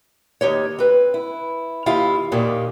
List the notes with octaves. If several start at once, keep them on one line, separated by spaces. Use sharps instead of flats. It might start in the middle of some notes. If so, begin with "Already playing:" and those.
D#2 D#4 G4 C#5
C4 B4
E4
D#2 E4 F4 G4 F5
D#2 A#2 D#3 G4